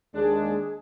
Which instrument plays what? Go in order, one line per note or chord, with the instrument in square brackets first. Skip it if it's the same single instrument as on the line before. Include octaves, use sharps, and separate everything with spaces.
[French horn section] D#2 G#3 [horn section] D4 [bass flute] G#4